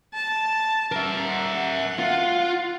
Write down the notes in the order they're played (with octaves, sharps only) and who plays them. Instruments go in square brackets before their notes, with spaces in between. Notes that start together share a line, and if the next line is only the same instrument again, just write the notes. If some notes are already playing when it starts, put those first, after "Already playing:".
[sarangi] A5
[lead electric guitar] A#4 E5
[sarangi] F#5
[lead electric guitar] F4